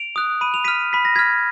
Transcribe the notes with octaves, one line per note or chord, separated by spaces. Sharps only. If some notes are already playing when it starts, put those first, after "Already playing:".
Already playing: D7 F7
D#6 F#6
B5 D#7
F7
F6 B6 D#7
B5 B6
A#6
F6 G#6 B6